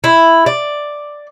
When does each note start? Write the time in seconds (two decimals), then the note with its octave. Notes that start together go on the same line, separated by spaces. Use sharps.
0.04 E4
0.46 D5